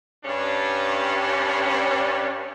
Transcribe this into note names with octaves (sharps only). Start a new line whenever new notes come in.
G2 C#4 D4